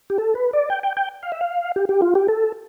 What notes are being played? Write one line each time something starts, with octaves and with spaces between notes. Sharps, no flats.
G4
A4
B4
D5
G5
G5
G5
F5
E5
F5
G4
G4
F4
G4
A4